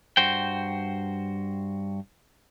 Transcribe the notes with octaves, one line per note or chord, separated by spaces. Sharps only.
G2 F#4 C5 G5